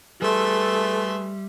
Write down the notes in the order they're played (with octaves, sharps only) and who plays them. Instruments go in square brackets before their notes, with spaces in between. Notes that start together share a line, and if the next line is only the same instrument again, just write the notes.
[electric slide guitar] G3 [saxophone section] A3 G#4 B4 [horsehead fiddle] A4 [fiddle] E5 C6